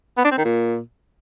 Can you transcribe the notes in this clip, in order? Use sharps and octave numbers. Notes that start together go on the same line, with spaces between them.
B3
D4
C4
D#3
A#2